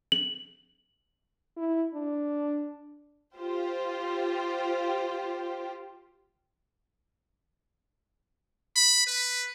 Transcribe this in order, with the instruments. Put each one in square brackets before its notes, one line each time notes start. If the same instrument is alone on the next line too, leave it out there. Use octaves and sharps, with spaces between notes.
[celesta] F#7
[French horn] E4
D4
[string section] F4 G4 C5
[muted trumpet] B5
B4